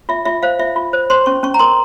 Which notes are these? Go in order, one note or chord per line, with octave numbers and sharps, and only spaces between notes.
F4 E5
F4 E5
C5 F5
F4 E5
F4
C5
C5 C6
C#4 C#6
C#4 C#6
A#5
A#4 C6